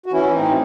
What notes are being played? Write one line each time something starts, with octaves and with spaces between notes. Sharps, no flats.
F#4
E3 C#4 E4
A2 C4 D#4